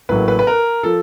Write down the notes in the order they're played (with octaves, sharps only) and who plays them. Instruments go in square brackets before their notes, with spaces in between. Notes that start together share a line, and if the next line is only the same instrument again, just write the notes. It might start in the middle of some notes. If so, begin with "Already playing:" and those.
[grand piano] A1 A2 F#3 A#3 B4
B4
B4
A#4
F3 A4